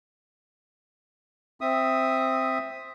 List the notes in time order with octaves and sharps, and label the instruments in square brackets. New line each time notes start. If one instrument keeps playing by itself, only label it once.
[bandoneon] C4 E5 D#6